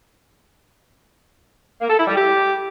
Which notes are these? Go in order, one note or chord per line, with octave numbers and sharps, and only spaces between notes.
A#3
A4
E4
G3
G4